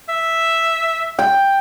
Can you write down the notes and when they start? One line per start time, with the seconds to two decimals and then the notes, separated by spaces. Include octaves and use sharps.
0.09 E5
1.19 G5